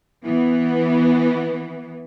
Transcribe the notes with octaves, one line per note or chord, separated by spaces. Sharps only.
E3 B3